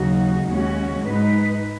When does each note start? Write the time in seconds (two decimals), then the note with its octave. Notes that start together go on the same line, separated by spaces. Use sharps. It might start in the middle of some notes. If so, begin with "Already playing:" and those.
Already playing: D#2 C#3 F#3 D#4 F#4
0.47 D#2 C#3 G#3 C#4 F#4
1.05 G#2 G#3 D#4 B4